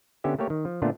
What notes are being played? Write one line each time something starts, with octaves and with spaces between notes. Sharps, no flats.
D3 B3 C#4 G4 E5
A3 A#3 G4 C#5
D#3
F3
A#2 D3 A3 B3 D4 F4